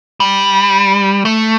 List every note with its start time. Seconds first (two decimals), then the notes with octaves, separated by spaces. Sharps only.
0.20 G3
1.25 A3